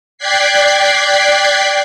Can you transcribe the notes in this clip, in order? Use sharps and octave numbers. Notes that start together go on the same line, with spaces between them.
D5 G5 F#6 G#6 B6 C7